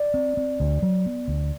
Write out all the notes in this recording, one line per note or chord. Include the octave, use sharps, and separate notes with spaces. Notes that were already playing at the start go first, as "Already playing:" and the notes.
Already playing: D5
C4
C4
D2
F#3
B3
D2